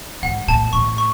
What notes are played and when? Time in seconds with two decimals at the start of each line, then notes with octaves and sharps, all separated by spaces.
0.23 G#2 F#5
0.48 A2 A5
0.73 A2 C#6
0.98 C#6